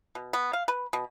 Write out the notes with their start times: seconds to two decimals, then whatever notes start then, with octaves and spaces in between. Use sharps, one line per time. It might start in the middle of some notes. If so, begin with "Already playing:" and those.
0.15 B2
0.33 B3
0.53 F5
0.68 B4
0.93 B2